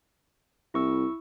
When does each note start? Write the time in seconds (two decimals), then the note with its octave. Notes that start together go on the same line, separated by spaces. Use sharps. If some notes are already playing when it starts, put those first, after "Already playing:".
0.74 C2 E4 C#6 E6